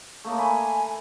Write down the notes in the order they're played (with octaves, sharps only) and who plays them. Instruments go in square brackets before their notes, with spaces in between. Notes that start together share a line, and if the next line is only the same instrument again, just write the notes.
[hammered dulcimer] A3 A#3 D#5 [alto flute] C#6
[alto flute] G#5 [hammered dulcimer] B5